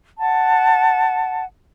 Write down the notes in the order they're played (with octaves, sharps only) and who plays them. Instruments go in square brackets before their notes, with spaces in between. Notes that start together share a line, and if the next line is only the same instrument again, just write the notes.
[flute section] F#5 A5